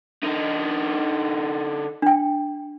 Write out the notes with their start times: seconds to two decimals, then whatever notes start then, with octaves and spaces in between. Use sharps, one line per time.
0.23 D3 D#4
2.02 D4 G5